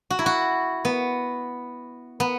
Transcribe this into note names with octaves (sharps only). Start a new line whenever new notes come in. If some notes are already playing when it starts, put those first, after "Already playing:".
F#4
E4
F#4
B3
B3